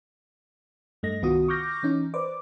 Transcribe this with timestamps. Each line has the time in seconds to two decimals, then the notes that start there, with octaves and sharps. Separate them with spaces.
1.03 G2 A3 D#5 A#6
1.22 C2 D#3 B3 F4 F#4 D#6
1.48 C#6 D6 F6 G6 A#6
1.83 E3 C#4 D#4
2.14 B4 C5 D5 D6